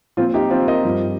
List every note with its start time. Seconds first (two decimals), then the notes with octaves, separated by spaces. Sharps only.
0.17 A#2 F3 C4 F4
0.34 D#4 G4
0.50 C4 F4
0.67 A#4 D#5
0.84 G2 F3